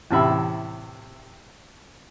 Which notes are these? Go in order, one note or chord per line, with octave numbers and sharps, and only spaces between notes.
E2 A2 C3 E5 B5